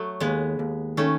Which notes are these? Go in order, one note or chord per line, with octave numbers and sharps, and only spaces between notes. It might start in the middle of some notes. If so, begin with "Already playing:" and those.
Already playing: F#3 A3
D#2 G#3 B3
D#2
D#3 A3 C#4